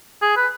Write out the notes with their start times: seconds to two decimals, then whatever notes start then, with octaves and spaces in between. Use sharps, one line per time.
0.22 G#4
0.36 B4